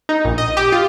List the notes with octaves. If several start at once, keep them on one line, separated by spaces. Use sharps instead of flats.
D#4
A#1
D#5
G4
F4